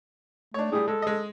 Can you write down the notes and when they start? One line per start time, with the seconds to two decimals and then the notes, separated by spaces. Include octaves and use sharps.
0.54 A3 D4 C#5
0.72 A2 G3 G#4
0.88 G#3 A4
1.02 G#3 D#5